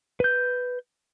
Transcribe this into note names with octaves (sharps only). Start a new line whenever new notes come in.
B4 G6